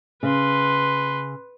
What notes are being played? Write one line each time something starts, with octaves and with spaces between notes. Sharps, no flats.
C#3 B4 C6